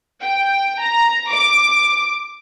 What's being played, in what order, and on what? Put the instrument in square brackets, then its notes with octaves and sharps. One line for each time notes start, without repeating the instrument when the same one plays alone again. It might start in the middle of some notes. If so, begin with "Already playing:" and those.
[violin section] G5
A#5
D6